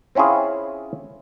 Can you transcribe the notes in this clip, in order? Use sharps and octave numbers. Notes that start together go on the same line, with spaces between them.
C4 C#4 E4 F4 G#4